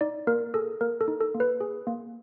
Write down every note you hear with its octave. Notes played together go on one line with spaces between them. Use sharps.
D#4 D5
A#3 A#4
G#4 A4
A#3 A#4
A4
D#4
A4
A#3
B4
G#4
A#3